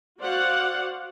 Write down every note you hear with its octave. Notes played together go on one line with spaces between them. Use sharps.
F#4 C5 D5 F5 F#5